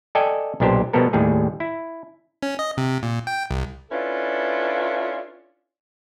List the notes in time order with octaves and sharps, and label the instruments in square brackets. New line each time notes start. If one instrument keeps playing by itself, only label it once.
[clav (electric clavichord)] A4 D5 D#5 G5 G#5
B1 A#2 D4 G4 C5
B2 F3 G3 B3 A4 A#4
D#2 A2 G3 G#4
E4
[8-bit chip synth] C#4
D#5
C3
A#2
G5
C2
[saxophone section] C#4 D4 E4 F4 A4 B4